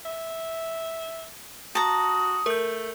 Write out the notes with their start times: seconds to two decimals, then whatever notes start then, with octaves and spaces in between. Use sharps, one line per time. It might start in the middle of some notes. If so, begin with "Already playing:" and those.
0.05 E5
1.75 F#4 A5 A#5 D#6
2.46 A3 A#4 G6